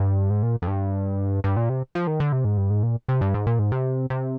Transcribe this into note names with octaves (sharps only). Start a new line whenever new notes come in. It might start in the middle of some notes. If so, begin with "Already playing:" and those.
Already playing: G2
G#2
A#2
F2
G2
G2
A#2
C3
F3
D#3
D3
C3
G#2
G2
G#2
A#2
C3
G2
G#2
A#2
G#2
C3
C3